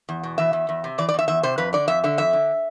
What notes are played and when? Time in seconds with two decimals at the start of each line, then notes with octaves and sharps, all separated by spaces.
0.09 E2
0.23 B2
0.38 E3 E5
0.53 E2
0.69 E2
0.84 C3
0.98 E3 D5
1.09 D5
1.14 E2 E5
1.28 E2 E5
1.43 C3 C5
1.58 F2 B4
1.73 D3 D5
1.88 F2 E5
2.04 D3 E5
2.18 F2 E5
2.33 D3